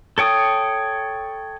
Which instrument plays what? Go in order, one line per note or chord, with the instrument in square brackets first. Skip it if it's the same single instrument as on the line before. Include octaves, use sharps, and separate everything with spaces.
[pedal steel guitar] A4 C#5 G5 D#6